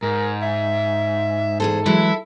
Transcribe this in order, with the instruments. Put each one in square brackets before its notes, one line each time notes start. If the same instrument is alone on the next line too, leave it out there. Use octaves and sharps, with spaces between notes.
[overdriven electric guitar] G#2 [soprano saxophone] A#4
[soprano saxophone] E5
[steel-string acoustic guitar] E2 G#4 C5 [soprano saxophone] A4
[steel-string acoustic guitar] E3 F#3 G#3 [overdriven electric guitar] E4